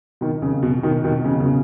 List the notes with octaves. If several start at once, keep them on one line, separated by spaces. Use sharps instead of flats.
B2 D#3
C#3
B2
B2 D#3
B2 D#3
C#3
C#3
B2